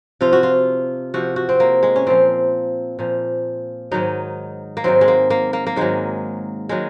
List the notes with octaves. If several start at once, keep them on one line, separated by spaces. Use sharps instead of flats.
C3 F3 F4
F#4
F4
C3 F3 F#4
F#4
C4
A#3
G#3
C#4
A#2 F3 C4
A#2 F3
G#2 D#3 F#3 D#4
A#3
G#2 D#3 F#3 C4
G#3
A#3
A#3
A#3
A#3
G#2 D#3 F#3 G#3
D#3 F#3 G#3